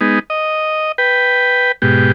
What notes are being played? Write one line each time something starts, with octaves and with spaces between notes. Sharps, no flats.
G#3 B3 D#4
D#5
B4 G5
G#2 B2 G4